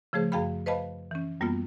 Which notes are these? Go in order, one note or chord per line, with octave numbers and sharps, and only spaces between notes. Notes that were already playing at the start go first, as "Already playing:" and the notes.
C#3 F3 A3 G#4 C5
F#2 G#4 F5 G5 B5
B4 C5 D#5 F5 A5 B5
E3 C#4
F#2 G3 A#3 B3 F4